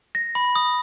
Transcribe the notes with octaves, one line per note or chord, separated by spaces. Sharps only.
A#6
B5
D#6